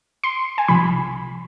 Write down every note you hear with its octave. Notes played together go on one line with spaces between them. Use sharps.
C6
G#5
C2 C3 F3 B5